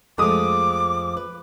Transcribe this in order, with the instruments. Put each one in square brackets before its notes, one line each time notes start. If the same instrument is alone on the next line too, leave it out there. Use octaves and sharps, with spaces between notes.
[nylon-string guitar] F2 F3 [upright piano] G#3 A3 D#6 [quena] D6
[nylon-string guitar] B4